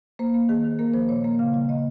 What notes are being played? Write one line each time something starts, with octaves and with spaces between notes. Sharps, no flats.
A#3 C5
A#3
D#3 G#4
D#3
A#3 A#4
F3 C5
A#2 C#5
A#3
C#3 F5
G3
A#3 D#5